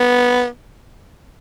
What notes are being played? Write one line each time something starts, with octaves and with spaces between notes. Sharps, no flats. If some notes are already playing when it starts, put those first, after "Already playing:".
Already playing: B3